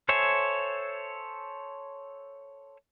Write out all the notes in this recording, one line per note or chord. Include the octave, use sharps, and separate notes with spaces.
A4 C5 C#5 E5 G#5